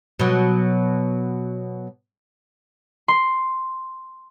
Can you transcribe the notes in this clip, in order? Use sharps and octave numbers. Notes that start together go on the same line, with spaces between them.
B2 F#3
C6